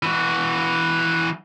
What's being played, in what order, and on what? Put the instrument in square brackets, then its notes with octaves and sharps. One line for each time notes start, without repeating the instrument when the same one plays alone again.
[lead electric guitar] E3 F#4